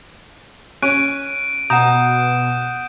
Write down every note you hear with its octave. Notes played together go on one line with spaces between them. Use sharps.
C#4 F#6 D7 D#7
B2 F#5 A#5 D#6 G6 E7